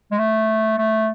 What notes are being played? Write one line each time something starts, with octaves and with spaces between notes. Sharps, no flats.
G#3
A3
A3